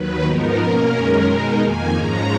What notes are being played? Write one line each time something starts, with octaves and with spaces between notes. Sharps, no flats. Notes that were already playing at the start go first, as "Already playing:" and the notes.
Already playing: D#2 D#3 F#3 B4
G#2 F3 B3 D#4 A#4
B2 A#3 C#4
F#2 D#3 G#3 C#4
B2 G#3 D#4 A#4
F2 D#3 A#3 G#5
G#2 F3 G#3 C#4 A#5